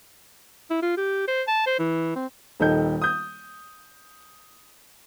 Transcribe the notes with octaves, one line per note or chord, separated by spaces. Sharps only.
E4
F4
G4
C5
A5
C5
E3
C4
D#1 D#3 D#4 A4 G6
D#6 G6